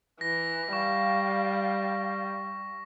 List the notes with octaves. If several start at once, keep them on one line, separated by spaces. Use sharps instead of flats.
E3 A#6
G3 F5 C#6